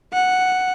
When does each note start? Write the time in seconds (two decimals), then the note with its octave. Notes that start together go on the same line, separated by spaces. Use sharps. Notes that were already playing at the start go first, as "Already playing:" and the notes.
0.12 F#5